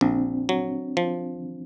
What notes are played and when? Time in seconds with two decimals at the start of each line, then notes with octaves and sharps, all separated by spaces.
0.01 A#1 C4 D4
0.49 F#3
0.97 F3